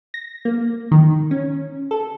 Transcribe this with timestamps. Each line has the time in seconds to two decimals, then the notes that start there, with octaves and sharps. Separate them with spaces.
0.14 A#6
0.45 A#3
0.91 D#3
1.31 C#4
1.91 A4